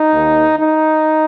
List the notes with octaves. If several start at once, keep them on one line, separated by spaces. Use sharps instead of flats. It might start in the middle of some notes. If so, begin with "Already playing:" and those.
Already playing: D#4
D#2 D#3
D#4